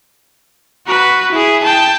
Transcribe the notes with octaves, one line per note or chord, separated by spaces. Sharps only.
F#4 B4
E4 G#4
G5 A5